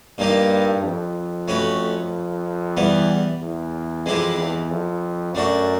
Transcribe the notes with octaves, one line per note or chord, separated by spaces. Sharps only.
G2 A#2 G3 A#3 D#4 G4
F2
A3 C#4 F#4 B4
E2 E3 G3 B3
E2
F2 E3 G#3 C4 E4 G4
E2
F2
F#2 A3 D4 F#4